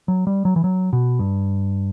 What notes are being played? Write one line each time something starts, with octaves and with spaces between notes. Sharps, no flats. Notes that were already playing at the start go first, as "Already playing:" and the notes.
F#3
G3
F#3
E3
F#3
B2
G2